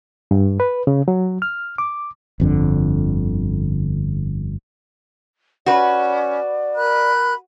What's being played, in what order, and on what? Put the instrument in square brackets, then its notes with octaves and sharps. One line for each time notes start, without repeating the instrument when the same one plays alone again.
[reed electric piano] G2
B4
C#3
F#3
F6
D6
[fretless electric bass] G1 F2 D3
[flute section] C#4 [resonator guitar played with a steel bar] F#4 B4 [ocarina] D5
[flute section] A#4 B5 F#6